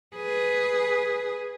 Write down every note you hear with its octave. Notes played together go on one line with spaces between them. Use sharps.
G#4 B4